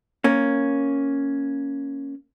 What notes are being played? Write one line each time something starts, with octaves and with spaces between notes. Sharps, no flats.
A#3 C#4